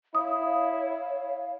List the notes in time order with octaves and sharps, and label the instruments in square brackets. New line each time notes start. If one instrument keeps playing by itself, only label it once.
[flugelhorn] E4 [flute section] C#5 F5 [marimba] D#6